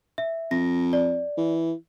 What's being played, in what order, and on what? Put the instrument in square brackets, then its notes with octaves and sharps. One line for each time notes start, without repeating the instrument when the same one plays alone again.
[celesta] E5
[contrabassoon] F2 [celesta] A#6
[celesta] D5
[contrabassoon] E3